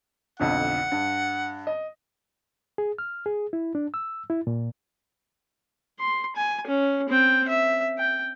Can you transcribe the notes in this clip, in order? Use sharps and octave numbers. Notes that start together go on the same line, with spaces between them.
B1 F2 D3 F#5
G2
D#5
G#4
F6
G#4
E4
D4
E6
E4
A#2
C6
G#5
C#4
C4 G5
E5
G5